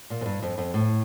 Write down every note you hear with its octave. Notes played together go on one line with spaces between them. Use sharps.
A#2
F2
G2
F2
F2
A2